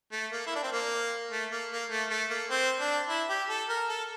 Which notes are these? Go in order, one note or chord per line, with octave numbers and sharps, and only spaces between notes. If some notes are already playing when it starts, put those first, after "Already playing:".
A3
A#3
E4
D4
C4
A#3
A3
A#3
A#3
A3
A3
A#3
C4
D4
E4
G4
A4
A#4
A4